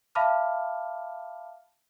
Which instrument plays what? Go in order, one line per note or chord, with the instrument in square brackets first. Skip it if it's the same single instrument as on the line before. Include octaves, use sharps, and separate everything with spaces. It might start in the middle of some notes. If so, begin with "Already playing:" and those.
[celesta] E5 F5 A5 B5 D6 F6